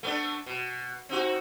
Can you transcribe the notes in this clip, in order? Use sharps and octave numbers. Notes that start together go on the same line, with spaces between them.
A3 B3 D4
B2
C4 D#4 F#4